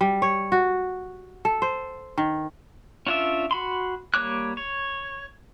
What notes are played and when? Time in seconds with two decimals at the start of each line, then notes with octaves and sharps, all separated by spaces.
0.01 G3
0.22 C#5
0.52 F#4
1.45 A4
1.62 C5
2.18 D#3
3.07 C#4 D4 F4 D5 E5
3.51 F#4 B5 C6
4.14 G3 A#3 C#5 D6 F#6
4.57 C#5